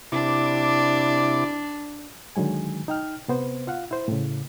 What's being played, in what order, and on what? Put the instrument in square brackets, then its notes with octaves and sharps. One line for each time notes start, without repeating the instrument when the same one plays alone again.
[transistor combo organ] C3 E4 D6 [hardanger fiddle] D4
[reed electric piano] D3 D#3 F#3 G#3 G#5
D#4 G5 F6
C3 B3 C5
F4 F5 F#5
E4 C5
A2 C#3